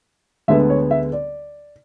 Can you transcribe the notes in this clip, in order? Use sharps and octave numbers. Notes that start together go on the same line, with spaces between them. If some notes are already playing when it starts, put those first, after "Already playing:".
D2 D3 G#3 B3 E5
C#5
E5
D5